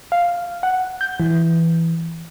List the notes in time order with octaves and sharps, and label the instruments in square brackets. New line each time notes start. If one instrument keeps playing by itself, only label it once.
[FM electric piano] F5
F#5
G6
E3